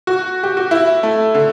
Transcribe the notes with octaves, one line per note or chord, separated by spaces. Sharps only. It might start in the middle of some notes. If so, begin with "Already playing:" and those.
F#4
G4
F#4
E4
A3
D3